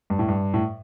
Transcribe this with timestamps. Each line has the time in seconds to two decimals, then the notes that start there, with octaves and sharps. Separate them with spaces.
0.10 G2
0.19 A2
0.29 G2
0.54 A2